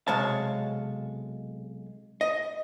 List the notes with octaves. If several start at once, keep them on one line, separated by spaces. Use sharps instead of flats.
B1 C3 G#3 C#5 F5 A5
D#5